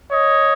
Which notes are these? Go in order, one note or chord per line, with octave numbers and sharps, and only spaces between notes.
C#5 D#5